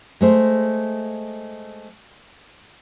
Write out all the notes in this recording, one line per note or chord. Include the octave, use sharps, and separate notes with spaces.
G#3 A3 C5